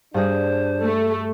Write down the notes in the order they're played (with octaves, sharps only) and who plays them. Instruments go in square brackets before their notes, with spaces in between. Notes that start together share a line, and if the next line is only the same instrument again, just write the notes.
[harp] G2 G#4 A#6 [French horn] D4 [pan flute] C5
[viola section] A3